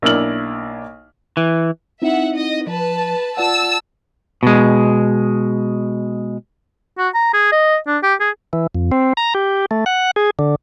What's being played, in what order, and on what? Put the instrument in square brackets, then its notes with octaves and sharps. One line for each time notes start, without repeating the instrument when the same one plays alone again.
[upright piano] B1 A#3 D4 E4 F6 F#7
[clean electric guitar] E3
[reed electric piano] C4 D#4 E4 [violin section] E5 F#5
[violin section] D#5
[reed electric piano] F3 [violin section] B4 A5
[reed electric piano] F4 D5 F#5 [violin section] A5 E6
[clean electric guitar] B2 G#3
[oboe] F#4
A#5
G#4
D#5
D4
G4
G#4
[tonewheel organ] E3
F2
C4
A#5
G4
A3
F#5
G#4
D3